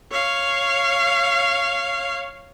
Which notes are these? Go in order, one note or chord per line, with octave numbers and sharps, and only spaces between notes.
C#5 F5